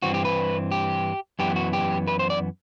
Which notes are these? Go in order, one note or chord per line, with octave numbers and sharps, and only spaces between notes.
G2 E3 C4 F#4
G4
B4
G4
F#2 E3 B3 G4
F#4
G4
B4
C5
D5